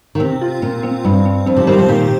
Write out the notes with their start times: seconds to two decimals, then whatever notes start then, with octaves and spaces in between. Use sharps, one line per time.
0.15 D#3
0.20 C3 C4
0.41 F4
0.62 A#2 C4
0.83 C4
1.04 G2 C4
1.26 C4
1.46 F2 C4
1.57 C3 F3
1.67 D#3 G3 C5
1.78 C3 F3
1.89 A#2 D#3 G4